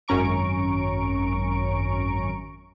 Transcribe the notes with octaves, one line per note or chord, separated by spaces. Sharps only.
G#1 F#2 C#4 A#5 C#6 D7